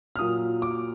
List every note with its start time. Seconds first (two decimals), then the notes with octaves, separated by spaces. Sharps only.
0.16 F6
0.19 A#2 F#3 A#3 F4 D#6
0.62 D6